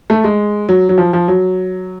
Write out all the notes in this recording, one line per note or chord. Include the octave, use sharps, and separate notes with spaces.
A3
G#3
F#3
F#3
F3
F3
F#3